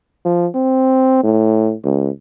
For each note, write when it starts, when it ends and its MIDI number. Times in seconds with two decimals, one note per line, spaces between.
0.25 0.47 53
0.55 1.19 60
1.23 1.74 45
1.84 2.10 37